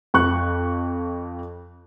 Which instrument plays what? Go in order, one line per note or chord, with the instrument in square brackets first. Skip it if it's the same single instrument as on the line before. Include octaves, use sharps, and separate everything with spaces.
[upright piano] F2 C#6 F#6